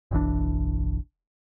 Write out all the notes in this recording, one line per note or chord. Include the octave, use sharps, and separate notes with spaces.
F#1 B1 E3 D4